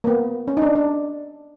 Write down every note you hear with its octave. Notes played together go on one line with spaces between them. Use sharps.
A#3
B3
C#4
D#4
D4
D4